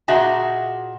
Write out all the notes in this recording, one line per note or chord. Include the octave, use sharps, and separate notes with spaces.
A#2 F#4 G#4 D#5 E5 A5